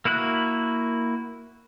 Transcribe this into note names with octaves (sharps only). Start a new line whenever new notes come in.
A#3 E4 F#4 B5 F#6